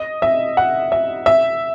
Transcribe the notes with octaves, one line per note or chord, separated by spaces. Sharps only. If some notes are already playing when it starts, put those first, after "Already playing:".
Already playing: D#5
E5
F#5
E5
E5